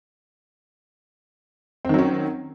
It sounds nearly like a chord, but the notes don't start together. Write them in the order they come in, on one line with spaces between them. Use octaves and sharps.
C4 D#3 F#3 C#4